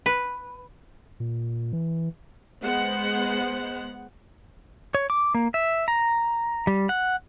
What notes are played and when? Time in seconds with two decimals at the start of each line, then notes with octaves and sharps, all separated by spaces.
0.06 B4
1.20 A#2
1.73 E3
2.63 G#3 B3 C5 F#5
4.95 C#5
5.10 D6
5.35 A#3
5.54 E5
5.88 A#5
6.67 G3
6.89 F#5